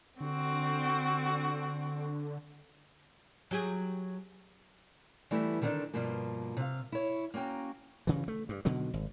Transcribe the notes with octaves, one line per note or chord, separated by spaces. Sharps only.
D3 C4 F#4
F#3 G4 G#4
E3 G3 A3 B3 E4
D3 D#3 B3 C4 D4 D#4
G2 B2 F3 A#3
C3 F5
E4 C#5
A#3 C#4 F#4 G5 A#5
G2 C#3 E3
A3
G2
B2 D3 D#3 F#3
G#1